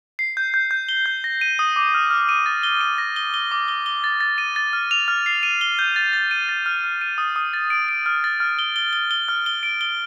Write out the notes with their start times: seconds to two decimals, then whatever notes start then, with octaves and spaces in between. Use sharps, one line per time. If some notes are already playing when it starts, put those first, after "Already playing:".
0.19 C7
0.37 G6
0.54 G6
0.71 G6
0.89 G7
1.06 G6
1.24 A#6
1.41 D#7
1.59 D#6
1.76 D6
1.94 F6
2.11 F6
2.29 D#7
2.46 A6
2.63 G7
2.81 D#7
2.98 A#6
3.16 G7
3.34 G7
3.51 D6
3.68 G7
3.86 G7
4.04 A6
4.21 A6
4.38 D#7
4.56 A6
4.73 F6
4.91 F7
5.08 F6
5.26 C7
5.43 D#7
5.61 G7
5.79 G6
5.96 A6
6.13 A6
6.31 D#7
6.49 A6
6.66 F6
6.84 F6
7.01 D#7
7.18 D#6
7.36 D#6
7.53 A6
7.70 D7
7.89 D7
8.06 F6
8.24 A6
8.40 F6
8.59 G7
8.76 G7
8.93 G7
9.11 G7
9.29 F6
9.46 G7
9.63 D7
9.81 G7